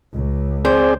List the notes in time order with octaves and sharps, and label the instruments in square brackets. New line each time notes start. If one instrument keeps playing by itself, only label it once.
[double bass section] C#2
[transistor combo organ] C4 G#4 D5 [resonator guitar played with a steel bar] C5